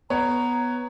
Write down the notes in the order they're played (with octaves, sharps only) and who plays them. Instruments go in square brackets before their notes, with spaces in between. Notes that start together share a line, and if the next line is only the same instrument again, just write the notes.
[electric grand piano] B3 [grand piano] C#5 [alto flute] A#5